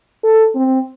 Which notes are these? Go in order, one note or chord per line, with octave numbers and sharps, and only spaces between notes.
A4
C4